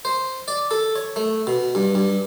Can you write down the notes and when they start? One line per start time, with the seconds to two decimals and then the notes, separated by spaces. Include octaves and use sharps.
0.05 C5
0.48 D5
0.71 A4
0.96 C#5
1.16 A3
1.47 B2
1.75 G2
1.95 G2